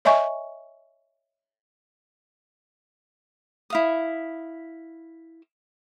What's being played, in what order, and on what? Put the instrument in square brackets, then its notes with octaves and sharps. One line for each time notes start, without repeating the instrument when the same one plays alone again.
[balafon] C#5 D#5 E5 G#5 C#6
[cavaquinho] E4 F5 D#6